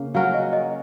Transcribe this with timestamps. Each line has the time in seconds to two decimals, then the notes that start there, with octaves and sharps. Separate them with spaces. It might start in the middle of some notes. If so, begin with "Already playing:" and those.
Already playing: C#3 A#3
0.15 F#3 C#4 F#4 A#4 F5
0.34 D#5
0.53 D#5